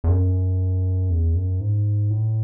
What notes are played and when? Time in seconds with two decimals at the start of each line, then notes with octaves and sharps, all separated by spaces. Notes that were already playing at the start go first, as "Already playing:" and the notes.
0.04 E2
0.08 F#2
1.10 E2
1.35 F#2
1.60 G#2
2.10 A2